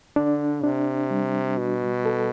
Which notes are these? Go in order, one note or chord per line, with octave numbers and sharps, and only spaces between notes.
D3 D4
C3 D4
G3
B2 F#4
A4